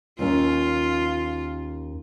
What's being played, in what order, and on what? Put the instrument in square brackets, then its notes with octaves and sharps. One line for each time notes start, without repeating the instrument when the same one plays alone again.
[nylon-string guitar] D#2 C#4 [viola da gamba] F4